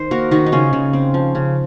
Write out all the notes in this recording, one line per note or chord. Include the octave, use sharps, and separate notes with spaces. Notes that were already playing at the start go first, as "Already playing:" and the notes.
Already playing: D#3 C5
A#3 F#4 A#4
D#3 D#4 F#4
D#4
C#3 C#4 F4
C#3
C4
F3
C#3